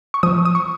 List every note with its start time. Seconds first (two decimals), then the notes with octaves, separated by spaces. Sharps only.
0.14 C#6
0.23 F3 D#6
0.45 D#6
0.55 C#6